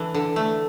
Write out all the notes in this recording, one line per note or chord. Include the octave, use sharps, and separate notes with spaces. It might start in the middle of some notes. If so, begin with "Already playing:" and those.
Already playing: E3 D4 A4
D3
A3